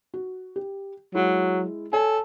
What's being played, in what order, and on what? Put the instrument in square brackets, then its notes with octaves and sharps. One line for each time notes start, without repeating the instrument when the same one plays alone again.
[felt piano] F#4
G4
[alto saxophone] F#3 [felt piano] G#3 E4
[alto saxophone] A4 [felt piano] C#5 G#5